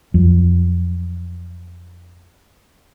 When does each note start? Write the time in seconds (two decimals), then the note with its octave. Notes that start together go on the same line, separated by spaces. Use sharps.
0.14 F2 F3 F#3